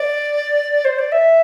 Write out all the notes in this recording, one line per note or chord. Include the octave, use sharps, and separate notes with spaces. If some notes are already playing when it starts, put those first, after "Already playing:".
Already playing: D5
C5
D5
E5